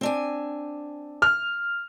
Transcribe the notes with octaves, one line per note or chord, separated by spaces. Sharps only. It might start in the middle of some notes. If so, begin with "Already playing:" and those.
C4 D4 G#5
F6